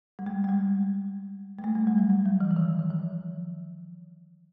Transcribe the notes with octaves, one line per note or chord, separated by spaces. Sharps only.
G3
G#3
G#3
G3
G#3
A3
G3
G3
F#3
G3
F#3
E3
E3
D#3
D#3
F3